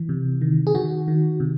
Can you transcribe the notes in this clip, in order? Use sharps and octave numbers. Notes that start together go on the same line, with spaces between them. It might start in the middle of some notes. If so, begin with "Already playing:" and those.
Already playing: E3
C3
D#3
G#4
D#3 F#4
D#3
C3